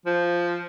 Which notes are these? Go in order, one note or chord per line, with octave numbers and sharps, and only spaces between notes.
F3